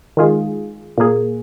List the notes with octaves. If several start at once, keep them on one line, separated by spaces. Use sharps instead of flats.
D#3 G#3 F4 G#4
A#2 A#3 G#4